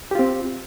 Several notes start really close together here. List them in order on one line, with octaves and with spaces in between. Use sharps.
G4 F4 C4